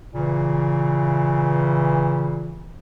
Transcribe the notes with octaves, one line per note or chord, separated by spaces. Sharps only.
A#2 C#3 E3